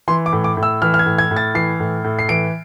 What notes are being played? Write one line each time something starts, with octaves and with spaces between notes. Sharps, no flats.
E3 C6
D6
A2
D6
A2
E6
E3 F6
F6
G#6
A2
G#6
A2
A6
E3 C7
A2
A2
C7
E3 D7